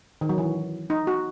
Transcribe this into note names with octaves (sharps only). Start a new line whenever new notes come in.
D#3
F#3
E3
D#4
F#4